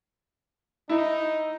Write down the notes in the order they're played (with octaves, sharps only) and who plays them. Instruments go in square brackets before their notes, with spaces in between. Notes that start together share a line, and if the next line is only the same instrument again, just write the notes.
[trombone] D#4 [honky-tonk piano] E4